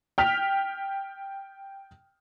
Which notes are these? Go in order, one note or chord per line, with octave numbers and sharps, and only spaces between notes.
G5 F6 B6